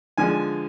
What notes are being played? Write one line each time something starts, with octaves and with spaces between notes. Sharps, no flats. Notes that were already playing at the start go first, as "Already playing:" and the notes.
D3 F3 G#3 G#5